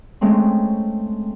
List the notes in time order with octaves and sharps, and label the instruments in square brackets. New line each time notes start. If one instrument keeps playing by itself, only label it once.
[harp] G#3 A3 C4 C#4